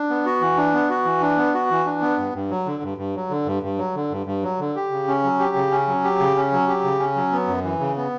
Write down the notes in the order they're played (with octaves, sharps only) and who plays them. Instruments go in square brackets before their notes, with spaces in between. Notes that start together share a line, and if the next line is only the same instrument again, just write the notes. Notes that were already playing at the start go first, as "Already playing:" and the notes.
Already playing: [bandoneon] D4
B3
F#4
E3
D4
B3
F#4
E3
D4
B3
F#4
E3
D4
B3
G2
G2
F#3
D3
G2
G2
F#3
D3
G2
G2
F#3
D3
G2
G2
F#3
D3
G4
C#3
C#4
F#3
G4
C#3
C#4
F#3
G4
C#3
C#4
F#3
G4
C#3
C#4
F#3
B3
F#2
E3
C#3
B3